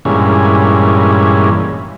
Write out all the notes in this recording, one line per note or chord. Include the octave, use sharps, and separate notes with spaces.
G2 A#2 E3 G#3 C#4